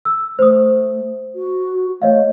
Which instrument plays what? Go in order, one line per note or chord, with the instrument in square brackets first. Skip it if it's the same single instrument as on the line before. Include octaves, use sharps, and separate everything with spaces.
[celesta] E6
[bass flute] A3 [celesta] C5 D#6
[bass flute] F#4
[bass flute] A3 [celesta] C#5 D#5 F5